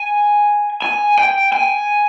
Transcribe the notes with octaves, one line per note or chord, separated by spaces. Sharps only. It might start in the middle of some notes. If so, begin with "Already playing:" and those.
Already playing: G#5
G#5
G5
G#5